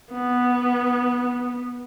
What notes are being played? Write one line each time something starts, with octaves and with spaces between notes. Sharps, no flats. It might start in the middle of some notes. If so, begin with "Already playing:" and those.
B3